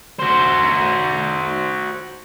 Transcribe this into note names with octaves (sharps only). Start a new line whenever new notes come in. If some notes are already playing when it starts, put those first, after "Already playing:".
F#4 C5